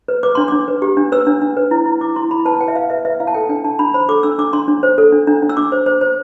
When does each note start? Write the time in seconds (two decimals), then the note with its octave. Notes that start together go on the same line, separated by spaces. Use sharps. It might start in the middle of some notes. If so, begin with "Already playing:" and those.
0.08 B4
0.23 B4 D6
0.35 D4 C6
0.48 D4 D6
0.68 B4
0.82 G4
0.97 D4
1.12 B4 E6
1.27 D4
1.42 D4
1.57 B4
1.71 E4
1.86 E4
2.01 E4 D6
2.16 E4 C6
2.31 E4 B5
2.45 B4 A5
2.60 B4 G5
2.68 E5
2.75 B4 F5
2.90 B4 E5
3.05 B4 E5
3.20 E4 F5
3.27 A5
3.34 A4 G5
3.49 D4 G5
3.64 D4 A5
3.79 D4 B5
3.94 C5 B5
4.09 A4 D6
4.23 D4 E6
4.39 D4 D6
4.53 D4 C6
4.68 D4
4.83 C5
4.98 A4
5.12 D4
5.27 D4
5.42 D4
5.49 E6
5.57 D4 D6
5.72 C5
5.86 C5
6.01 C5